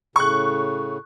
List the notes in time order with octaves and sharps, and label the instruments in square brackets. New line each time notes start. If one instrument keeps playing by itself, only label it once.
[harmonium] A2 C#3 [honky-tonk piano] C#6 F#6